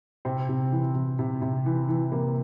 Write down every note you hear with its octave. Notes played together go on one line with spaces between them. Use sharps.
C3 C4
C3
E3
C3
C3
C3
E3
E3
C3 A#3